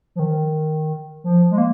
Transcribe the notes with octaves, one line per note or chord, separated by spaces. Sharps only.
F3
D#3
F3
G#3
A#3